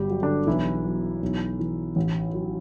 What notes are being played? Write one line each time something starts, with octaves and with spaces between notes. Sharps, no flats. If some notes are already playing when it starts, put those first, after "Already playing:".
Already playing: G1 F#3 G3 G4
F#3
D3 D4
B1 E3 E4
F#3
B1
E3
A1
F#3